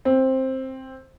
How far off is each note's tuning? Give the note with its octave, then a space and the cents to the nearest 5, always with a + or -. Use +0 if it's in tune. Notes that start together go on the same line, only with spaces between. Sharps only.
C4 +10